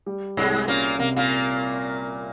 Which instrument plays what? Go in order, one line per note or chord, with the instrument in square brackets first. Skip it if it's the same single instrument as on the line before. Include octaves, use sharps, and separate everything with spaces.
[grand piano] G3
[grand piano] C2 [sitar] G#2 G#3
[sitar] A#2 A#3 [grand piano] C#4
[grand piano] C3 [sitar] A#3
[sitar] A#2 A#3